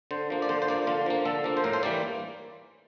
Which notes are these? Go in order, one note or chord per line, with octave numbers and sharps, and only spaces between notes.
D3 C5
F3 A#3
D5
D3 C5
C5
F3 A#3 D5
D3 F4
F3 A#3
D3 A4
F3 A#3
C5
A2 A#4
C5
E3 G3 A#3 D5